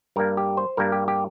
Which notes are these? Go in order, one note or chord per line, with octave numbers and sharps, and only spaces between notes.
G2 G3 A#3 A#4
G4
C5
G2 G3 A#3 A#4
G4
G4